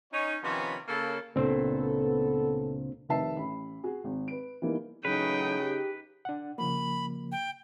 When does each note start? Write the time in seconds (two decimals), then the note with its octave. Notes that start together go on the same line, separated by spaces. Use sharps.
0.12 C#4 D#4 C#5
0.43 C3 D#3 F3 B3 C#4
0.88 C#3 A#3 A4
1.36 C#2 A#2 B3 C4 D4 A4 C5
3.09 F1 D#3 B4 E5 A5 C7
3.37 A1 B5
3.84 F#4 G#4
4.04 G#1
4.28 B4 D7
4.62 E3 G3 A#3 B3 D#4
5.05 A2 C#3 E3 F#3 D#4 B4 G5
5.61 G4
6.25 D4 F#5
6.58 C#3 F3 A#3 B5
7.32 G5